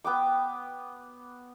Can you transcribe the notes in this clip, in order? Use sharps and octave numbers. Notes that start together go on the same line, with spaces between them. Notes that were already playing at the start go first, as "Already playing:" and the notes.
B3 G5 D6